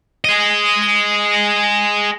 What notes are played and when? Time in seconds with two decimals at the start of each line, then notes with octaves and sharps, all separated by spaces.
0.25 G#4 D#5